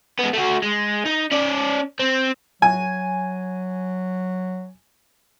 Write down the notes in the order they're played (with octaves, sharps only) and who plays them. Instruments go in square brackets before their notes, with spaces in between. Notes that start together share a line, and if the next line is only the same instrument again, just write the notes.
[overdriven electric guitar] G#3 B3
A3 F#4
G#3
D#4
C#4 D5
C4
[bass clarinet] F#3 [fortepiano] G#5